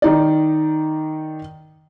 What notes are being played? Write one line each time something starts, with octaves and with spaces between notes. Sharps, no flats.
D#3 D#4 D5